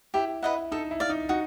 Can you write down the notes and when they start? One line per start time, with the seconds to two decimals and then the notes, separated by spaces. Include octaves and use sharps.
0.14 E4 G4
0.43 E4 B4 D#5 F#5
0.72 D#4 A4
0.91 E4
1.00 D5 F5
1.10 D#4
1.29 D#4 F#4